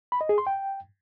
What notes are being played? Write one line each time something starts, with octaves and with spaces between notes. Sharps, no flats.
B5
D#5
G#4
C6
G5